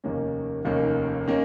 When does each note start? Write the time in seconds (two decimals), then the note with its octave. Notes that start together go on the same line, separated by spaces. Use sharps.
0.04 F1 D#2 D#3 A#3 C#4
0.65 F1 D#2 D#3 A#3 C#4
1.28 D#3 A#3 C#4